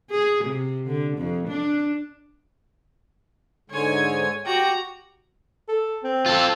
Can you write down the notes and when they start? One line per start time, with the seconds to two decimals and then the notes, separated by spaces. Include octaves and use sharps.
0.11 G#4
0.45 C3
0.87 D3
1.18 F2
1.48 D4
3.70 G#2 D3 G#3 C#5 G#5
4.46 F#4 G4 G5 A#5
5.68 A4
6.03 C4
6.26 F4 A4